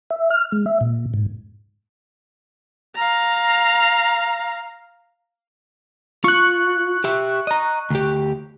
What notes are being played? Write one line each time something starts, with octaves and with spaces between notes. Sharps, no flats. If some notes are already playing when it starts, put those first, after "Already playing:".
E5
F6
G#3
E5
A#2
G#2
F5 A#5
F4 C#6 F#6
G4 E5
D#5 A#5
D2 G4